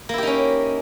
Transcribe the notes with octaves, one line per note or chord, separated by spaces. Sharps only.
A#3 C#4 D#4 E4 G4